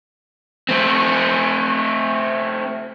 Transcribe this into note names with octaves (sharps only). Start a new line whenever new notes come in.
A3 C4